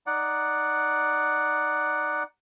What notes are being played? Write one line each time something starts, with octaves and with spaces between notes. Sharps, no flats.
D#4 D5 F#5